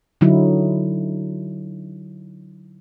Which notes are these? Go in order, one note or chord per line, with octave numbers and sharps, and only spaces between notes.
D3 F#3 D#4 E4